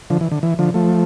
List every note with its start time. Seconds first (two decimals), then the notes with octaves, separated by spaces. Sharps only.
0.10 D3 F3
0.21 E3
0.32 D3
0.43 E3
0.59 D3 F3
0.74 F3 A3